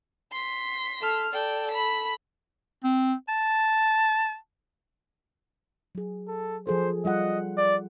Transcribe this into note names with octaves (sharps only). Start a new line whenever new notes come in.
C6 B6
A4 F6
A4 D5 G5
B5 B6
C4
A5
F#3 G#4
A4
F3 G#4 A4 C5
G3 F4 D#5 F#5
D5